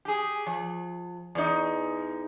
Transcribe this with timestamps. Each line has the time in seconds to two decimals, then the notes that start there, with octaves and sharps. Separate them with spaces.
0.05 G4 G#4
0.46 F3
1.35 E2 D#4